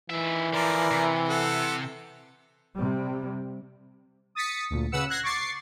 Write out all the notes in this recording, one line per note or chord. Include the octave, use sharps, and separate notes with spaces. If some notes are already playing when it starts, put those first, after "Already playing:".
D#3 E3 E5
D3 F3 A#4 D5
C3
A4 F#5
C3 G3
D#6 A6 B6 C#7
D2 A#2
C#3 B4 F#5 E6 C#7
F#6 G#6 A#6 C7
C#6 D6 A6 C7